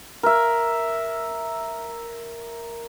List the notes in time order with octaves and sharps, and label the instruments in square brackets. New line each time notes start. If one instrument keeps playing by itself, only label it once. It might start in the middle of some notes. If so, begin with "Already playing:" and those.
[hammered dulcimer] A#4 E5